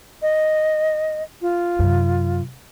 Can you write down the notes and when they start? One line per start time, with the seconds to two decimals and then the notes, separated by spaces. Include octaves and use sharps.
0.22 D#5
1.42 F4
1.79 F#2 C3